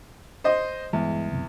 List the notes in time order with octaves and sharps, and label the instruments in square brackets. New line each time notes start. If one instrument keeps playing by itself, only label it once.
[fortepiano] C5 D#5
[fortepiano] E2 [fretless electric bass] G2 E3 G#3
[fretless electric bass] C#2 F#2 C3